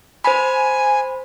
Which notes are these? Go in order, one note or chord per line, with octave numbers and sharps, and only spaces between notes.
C5 G#5 B5